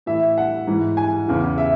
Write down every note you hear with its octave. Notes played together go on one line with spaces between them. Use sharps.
A2 E3 E5
F#5
G#2 E3
G#5
E2 C#3 E3
E5